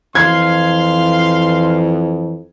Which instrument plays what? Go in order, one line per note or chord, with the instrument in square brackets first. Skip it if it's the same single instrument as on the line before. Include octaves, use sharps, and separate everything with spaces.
[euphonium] F2 [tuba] E3 [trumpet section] F5 C6 [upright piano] G#6